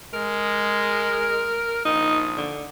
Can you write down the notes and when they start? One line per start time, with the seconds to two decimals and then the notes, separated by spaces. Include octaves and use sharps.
0.13 G#3 A#4
1.85 A#1 D#4
2.38 D3